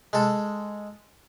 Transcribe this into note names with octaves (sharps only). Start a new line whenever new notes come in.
G#3 A4